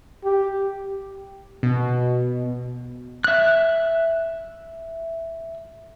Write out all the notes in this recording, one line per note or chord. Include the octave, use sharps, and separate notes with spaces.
G4
B2
E5 F#6